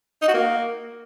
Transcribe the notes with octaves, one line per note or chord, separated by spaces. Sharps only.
D#4
F#4
A#3